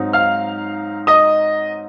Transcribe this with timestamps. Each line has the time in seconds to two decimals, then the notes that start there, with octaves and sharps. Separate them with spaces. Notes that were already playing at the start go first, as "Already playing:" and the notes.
Already playing: G#2 F#3 C4 D#4
0.13 F5 F6
1.07 D#5 D#6